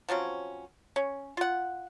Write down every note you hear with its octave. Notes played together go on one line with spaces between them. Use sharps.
F3 F#3 C4 C#4
C#4
F4 F#5